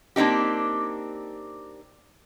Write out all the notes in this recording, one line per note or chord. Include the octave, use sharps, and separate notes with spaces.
A#3 C4 D4 D#4 G4